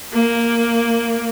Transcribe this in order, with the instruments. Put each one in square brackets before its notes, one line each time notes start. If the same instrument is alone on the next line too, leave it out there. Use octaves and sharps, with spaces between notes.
[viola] A#3